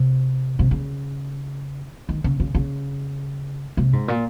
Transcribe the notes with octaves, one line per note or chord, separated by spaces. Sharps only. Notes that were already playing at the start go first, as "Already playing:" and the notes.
Already playing: C3
C3
C#3
D#3
C#3
C#3
C#3
C3
G#2
A#2